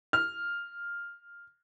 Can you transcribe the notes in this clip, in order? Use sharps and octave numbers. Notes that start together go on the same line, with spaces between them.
F6